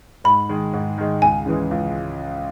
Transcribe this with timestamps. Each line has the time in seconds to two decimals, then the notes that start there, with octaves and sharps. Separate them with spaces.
0.24 G#2 B5
0.49 D#3 G#3
0.73 G#2
0.98 D#3 G#3
1.22 C#2 G#5
1.46 C#3 E3 G#3
1.71 C#2